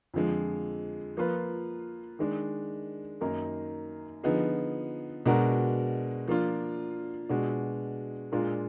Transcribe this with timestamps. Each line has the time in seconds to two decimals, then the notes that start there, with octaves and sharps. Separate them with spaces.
0.14 F2 D3 F3 G#3
1.17 F3 A#3 F4 B4
2.19 D#3 G#3 D4
3.21 F#2 D#3 A#3 D#4 A#4
4.24 D3 F3 B3 D#4 G#4
5.26 B2 G#3 D4 F#4 A#4
6.28 F3 A#3 D4 F4
7.29 B2 G#3 D4 F#4
8.32 A#2 G#3 D4 F4 A#4